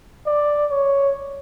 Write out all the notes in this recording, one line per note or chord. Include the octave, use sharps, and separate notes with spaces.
D5
C#5